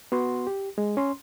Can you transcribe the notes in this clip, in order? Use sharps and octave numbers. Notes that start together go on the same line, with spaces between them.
B3 F#4 C6
G4
G#3
C#4 C6